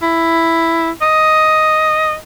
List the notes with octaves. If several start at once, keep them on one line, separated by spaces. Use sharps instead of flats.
E4
D#5